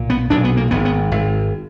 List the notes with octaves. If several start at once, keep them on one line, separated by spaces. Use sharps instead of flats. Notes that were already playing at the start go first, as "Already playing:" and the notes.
Already playing: B1 A#2
B3
B1 A#2 D4
B3
A#3
G#1 G#2 B3
B3
G#1 G#2